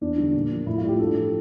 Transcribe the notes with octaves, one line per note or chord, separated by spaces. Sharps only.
E2 D4
D3 G3
A#2
F3
A2 E4
F4
G3
G4
G2 A4
F3